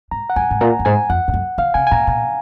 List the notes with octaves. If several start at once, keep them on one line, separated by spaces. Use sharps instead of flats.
G#2 A#5
F#5
F#2 G#5
G#2
A#2 A#5
F#2
G#2 G#5
F2 F#5
G#2
F#2
D#3 F5
C#3 G#5
G#5
A#2 A#5
A#2